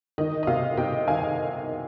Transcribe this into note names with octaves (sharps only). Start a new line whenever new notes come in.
D#3 D#5
D#5
C3 F5
C3 D#5 G5
D#3 F5 G#5